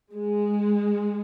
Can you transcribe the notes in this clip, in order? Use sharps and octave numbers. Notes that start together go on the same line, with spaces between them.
G#3